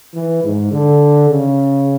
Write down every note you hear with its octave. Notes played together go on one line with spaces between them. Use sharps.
E3
G#2
D3
C#3